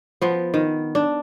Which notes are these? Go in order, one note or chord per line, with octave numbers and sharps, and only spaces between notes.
F3 B3
D#3
D4